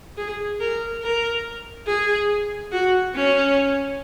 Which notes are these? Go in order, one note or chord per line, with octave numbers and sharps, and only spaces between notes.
G#4
A#4
A#4
G#4
F#4
C#4